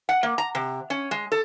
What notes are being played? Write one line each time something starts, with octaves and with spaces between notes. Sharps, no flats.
F#5
A#3
A#5
C3
C#4
G#3
A4